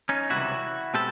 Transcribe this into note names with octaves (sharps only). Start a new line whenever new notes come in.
C#4 D#4
C#2 C3 E3 G3 E4 F#4
B2 G#3 C4 G4 A4